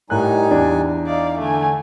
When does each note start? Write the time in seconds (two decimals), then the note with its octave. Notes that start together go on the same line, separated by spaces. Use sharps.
0.10 A2 G3 D#4 A#4 G#5 F#6
0.51 E2 D4
1.07 D#4 D5 F5
1.39 D3 A3 G#5